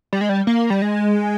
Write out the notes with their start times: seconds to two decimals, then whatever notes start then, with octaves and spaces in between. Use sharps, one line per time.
0.13 G3
0.21 G#3
0.29 G3
0.47 A#3
0.70 G3
0.82 G#3